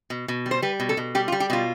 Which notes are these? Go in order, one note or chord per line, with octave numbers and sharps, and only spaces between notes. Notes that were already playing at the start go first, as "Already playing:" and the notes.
B2
B2
G3
C5
G3 B4
B2
A4
B2
G3 G4
F4
G3
G4
B2 F4